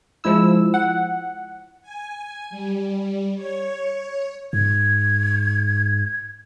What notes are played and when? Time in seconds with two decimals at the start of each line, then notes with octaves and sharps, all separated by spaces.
0.24 F3 G#3 E4 E6
0.74 F#5
1.82 G#5
2.50 G3
3.36 C#5
4.53 G#2 G#6